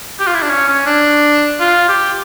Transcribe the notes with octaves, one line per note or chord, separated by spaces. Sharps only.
G4
F4
E4
D4
C#4
C#4
D4
F4
G4